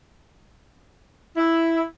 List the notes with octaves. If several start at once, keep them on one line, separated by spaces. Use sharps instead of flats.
E4